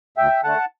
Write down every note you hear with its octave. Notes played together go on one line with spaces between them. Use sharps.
D2 E5 G5
D3 A3 F#5 A5